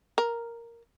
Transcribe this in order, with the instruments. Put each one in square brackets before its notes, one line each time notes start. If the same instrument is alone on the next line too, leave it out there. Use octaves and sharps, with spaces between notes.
[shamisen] A#4